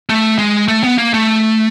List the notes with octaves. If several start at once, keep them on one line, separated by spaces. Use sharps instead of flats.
A3
G#3
A3
B3
A#3
A3